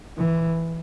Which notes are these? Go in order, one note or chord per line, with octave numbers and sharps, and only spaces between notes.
E3